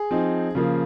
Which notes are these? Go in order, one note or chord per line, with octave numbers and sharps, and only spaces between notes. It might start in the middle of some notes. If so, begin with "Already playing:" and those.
Already playing: G#4
F3 C4 D#4
C#3 F3 A#3